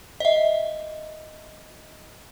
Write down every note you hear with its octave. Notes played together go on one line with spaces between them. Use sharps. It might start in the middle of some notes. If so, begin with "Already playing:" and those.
D#5 E5